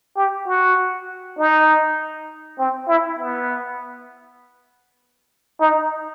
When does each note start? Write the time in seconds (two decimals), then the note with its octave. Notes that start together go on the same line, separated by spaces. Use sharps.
0.17 G4
0.47 F#4
1.38 D#4
2.59 C4
2.88 E4
3.19 B3
5.61 D#4